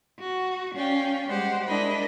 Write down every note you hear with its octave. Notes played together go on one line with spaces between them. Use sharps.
F#4
C#4 D5 F5 G5
G3 G#3 G4 C5 F#5
G#3 D4 E4 A#4 D#5 B5